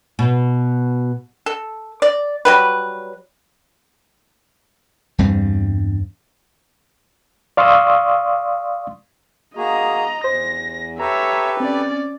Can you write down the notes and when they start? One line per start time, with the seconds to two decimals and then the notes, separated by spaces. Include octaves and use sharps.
0.19 B2
1.46 A4
2.02 D5
2.45 F#3 G3 B4
5.18 E2 G2 G3 C4
7.57 D5 F5 C6 C#6 D#6 E6
9.57 A#3 F#4 G#4 D#5 A#5
10.24 E2 C5 A#6
10.99 G4 A4 B4 C#5 E5 A#5
11.60 C4 C#4 D5